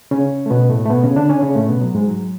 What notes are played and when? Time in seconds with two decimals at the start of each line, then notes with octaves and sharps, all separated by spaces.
0.11 C#3 C#4
0.46 A3
0.50 B2 B3
0.70 A2 A3
0.86 A3
0.90 B2 B3
1.03 C#3 C#4
1.16 D3 D4
1.29 C#3 C#4
1.42 C#3 C#4
1.55 A2 A3
1.69 B2 B3
1.81 F#3
1.95 G#2 G#3
2.08 F#3